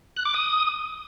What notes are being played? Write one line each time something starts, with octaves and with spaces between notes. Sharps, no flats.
F#6
D6
D#6